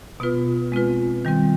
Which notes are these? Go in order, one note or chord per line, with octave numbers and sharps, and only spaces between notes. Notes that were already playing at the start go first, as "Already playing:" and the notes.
B2 B3 F4 B4
G#3 C4 F4 B4
D#3 G3 C4